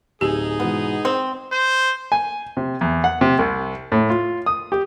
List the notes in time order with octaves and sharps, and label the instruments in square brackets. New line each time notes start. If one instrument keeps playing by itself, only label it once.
[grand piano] D1 G#5 [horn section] D#4 G#4 [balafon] G4
[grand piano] G#2 B2 E3 [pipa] B3
[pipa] C4 [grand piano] G5
[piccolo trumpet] C5
[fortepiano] G#5
C3
E2
F#5
C3
C2
A2
F4
D#6
G4